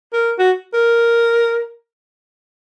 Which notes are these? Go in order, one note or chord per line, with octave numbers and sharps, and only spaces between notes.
A#4
F#4
A#4